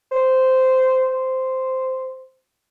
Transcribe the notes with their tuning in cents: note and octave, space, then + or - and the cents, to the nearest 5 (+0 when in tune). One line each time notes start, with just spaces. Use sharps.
C5 -10
C5 -10